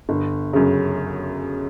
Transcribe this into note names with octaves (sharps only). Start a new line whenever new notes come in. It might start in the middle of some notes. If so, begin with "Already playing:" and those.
G1
F#2 C#3